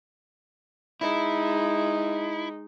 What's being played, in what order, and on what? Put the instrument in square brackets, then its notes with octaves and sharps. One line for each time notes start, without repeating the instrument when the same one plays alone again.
[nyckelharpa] G#3 D#4 [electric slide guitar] E4